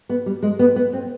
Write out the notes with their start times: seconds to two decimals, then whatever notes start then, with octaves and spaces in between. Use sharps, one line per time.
0.09 B3
0.26 G3
0.42 G#3
0.59 B3
0.76 B3
0.93 C4